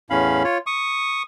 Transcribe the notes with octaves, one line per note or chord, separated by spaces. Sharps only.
E2 A2 C#4 F5 B5
F4 C#5
C#6 D#6